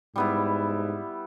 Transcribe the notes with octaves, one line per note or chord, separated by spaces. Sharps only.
G#2 G3 B3 E4